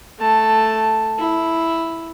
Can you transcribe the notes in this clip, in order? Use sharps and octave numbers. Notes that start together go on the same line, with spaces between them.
A3 A5
E4